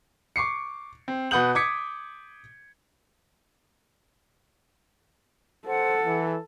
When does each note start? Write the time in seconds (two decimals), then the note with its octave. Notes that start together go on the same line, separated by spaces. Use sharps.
0.36 C#6 D6 C7 C#7
1.08 C4
1.31 B2 B4 F#5 D#6 G6 F#7
1.55 D6 D#6 G#6 B6 C#7
5.67 A4 C5 F#5
6.05 E3